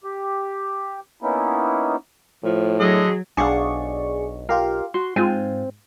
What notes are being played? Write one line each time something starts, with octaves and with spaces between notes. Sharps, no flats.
G4
A#3 B3 C#4 D#4 E4
A2 F3
D3 F#3 G#4 D#5
B1 D4 G#4 D5 F5 F#5 C#6
F4 G4 A#4 F5
F#4 C6
G#2 C4 F4 G#5